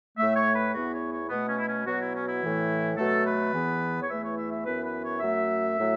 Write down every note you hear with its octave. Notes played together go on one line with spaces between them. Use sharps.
A2 A3 E5
C#5
B4
E2 E3 B3 F#4
C#5
C#5
B2 A3 B3
C#4
E4
C#4
B2 F#3 B3 F#4
E4
C#4
E4
A2 E3 A3
B2 F#3 A3 A4
B4
E2 E3 B3
C#5
E2 E3 A3 E5
C#5
E5
E5
F#2 E3 B3 B4
B4
C#5
F#2 F#3 A3 E5
A2 F#3 A3